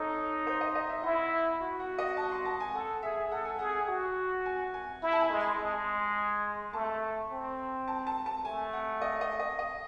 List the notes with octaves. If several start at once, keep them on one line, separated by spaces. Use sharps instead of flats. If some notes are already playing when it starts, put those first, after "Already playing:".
Already playing: D#4 A4 C#5
C5
D#5
D#5
E5
E4 F#5
F#4
F#5
D#5
A5
C6
A5
G#5
A4 F#5
G#4 E5
A4 F#5
G#5
G#4 F#5
F#4
G#5
G#5
E4
A5
G#5
G#3
C6
G#3
A3 A5
C4
A5
A5
A5
A3 G#5
F#5
D#5
D#5
D#5
D#5